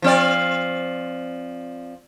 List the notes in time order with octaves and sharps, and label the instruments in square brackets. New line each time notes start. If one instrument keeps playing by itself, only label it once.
[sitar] F3 C4 D5